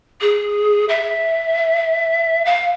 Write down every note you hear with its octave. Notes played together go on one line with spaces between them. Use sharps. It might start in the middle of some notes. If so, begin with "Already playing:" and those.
G#4
E5
F5